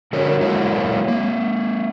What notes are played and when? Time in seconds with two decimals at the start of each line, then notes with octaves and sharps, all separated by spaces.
0.13 D3 D4 F#4 A#4 C#5
0.41 F#3 G#3 A#3 E4 F#4
1.08 G#3 A#3